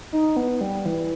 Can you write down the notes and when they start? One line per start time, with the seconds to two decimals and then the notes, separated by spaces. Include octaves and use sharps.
0.13 D#4
0.36 B3
0.61 G3
0.86 E3